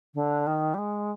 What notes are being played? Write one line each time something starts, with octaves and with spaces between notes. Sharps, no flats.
D3
D#3
G3
G#3